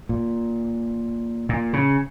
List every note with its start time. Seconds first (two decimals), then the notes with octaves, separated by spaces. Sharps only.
0.09 A#2
1.49 A#2
1.73 C#3